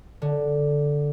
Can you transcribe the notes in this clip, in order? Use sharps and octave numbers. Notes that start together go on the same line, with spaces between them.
D3